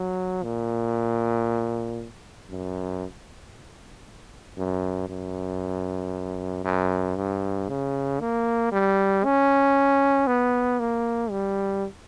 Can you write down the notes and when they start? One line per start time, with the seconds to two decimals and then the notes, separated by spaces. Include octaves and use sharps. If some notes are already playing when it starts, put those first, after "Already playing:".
Already playing: F#3
0.43 A#2
2.50 F#2
4.57 F#2
5.09 F#2
6.64 F#2
7.16 G2
7.69 C#3
8.20 A#3
8.72 G3
9.25 C#4
10.27 B3
10.80 A#3
11.31 G3